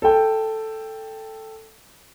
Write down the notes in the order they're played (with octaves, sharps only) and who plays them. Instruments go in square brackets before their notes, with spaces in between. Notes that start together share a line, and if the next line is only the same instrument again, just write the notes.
[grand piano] A4 G5